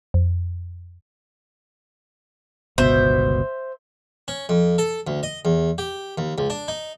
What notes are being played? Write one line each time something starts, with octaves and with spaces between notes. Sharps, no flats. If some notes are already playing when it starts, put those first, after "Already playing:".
F2
G1 C#2 B2 C5 E5
C#4
F2
A4
D2
D#5
E2
G4
D#2
C#2
D4
D#4